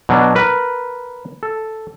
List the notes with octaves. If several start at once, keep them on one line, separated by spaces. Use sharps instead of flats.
B2 F#3 D4
A#4 B4
A4